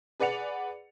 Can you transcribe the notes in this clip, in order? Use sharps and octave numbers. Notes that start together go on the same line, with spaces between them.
G#4 B4 D5 F#5 C#7 F7